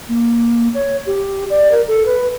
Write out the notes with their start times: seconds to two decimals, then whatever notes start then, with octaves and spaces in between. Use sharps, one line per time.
0.09 A#3
0.74 C#5
1.06 G4
1.50 D5
1.71 A#4
1.87 A4
2.05 B4